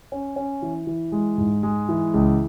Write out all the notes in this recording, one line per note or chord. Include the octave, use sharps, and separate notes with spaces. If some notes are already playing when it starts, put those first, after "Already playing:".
C#4
C#4
E3
E3
G#3
G#2
G#3
E3
C#2